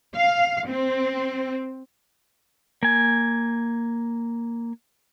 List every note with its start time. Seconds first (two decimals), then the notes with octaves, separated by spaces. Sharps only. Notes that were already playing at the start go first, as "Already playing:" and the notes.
0.16 F5
0.69 C4
2.83 A#3 G#5